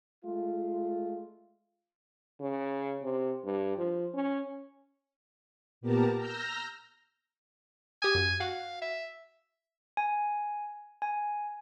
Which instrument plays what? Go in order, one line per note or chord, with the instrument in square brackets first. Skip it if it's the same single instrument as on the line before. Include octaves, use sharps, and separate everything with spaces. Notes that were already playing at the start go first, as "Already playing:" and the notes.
[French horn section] G#3 A3 F4
[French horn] C#3
C3
G2
F3
C#4
[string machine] A#2 B3 G4 A#4 A5 A#5
A#5 E6 F6 G6 A#6
[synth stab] G4 D#6 [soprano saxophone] G#5
[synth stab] F#2
[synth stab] F#4 [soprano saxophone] F5
[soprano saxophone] E5
[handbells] G#5
G#5